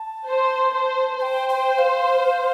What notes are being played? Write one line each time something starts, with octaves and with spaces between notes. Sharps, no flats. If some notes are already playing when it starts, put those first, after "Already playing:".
Already playing: A5
C5
C5
C5 G5 A5
G5
F5